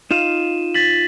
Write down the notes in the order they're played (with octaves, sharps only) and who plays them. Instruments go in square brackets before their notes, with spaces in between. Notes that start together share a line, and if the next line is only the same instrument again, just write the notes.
[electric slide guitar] D#4 F4 F5 [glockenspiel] D#7 E7
[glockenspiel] A6 B6 F#7